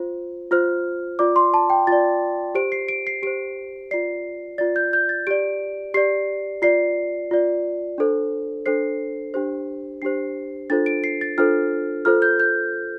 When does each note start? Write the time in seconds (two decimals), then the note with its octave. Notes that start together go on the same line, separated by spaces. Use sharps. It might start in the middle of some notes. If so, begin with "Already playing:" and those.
Already playing: F4 C5
0.51 F4 C5 F6
1.19 F4 D5 D6
1.36 C6
1.54 A5
1.70 G5
1.87 F4 D5 A6
2.55 G4 C5 D7
2.72 C7
2.88 D7
3.07 C7
3.23 G4 C5 D7
3.91 F4 D5 C7
4.58 F4 D5 A6
4.76 G6
4.93 G6
5.09 A6
5.27 G4 D5 D7
5.94 G4 D5 C7
6.62 F4 D5 C7
7.31 F4 D5
7.98 D4 A4 C5
8.66 D4 A4 C5 C7
9.34 D4 G4 C5
10.02 D4 G4 C5 C7
10.70 D4 F4 A4 C5 A6
10.86 D7
11.04 C7
11.21 A6
11.38 D4 F4 A4 C5 F6
12.05 F4 A4 C5 F6
12.22 G6
12.40 G6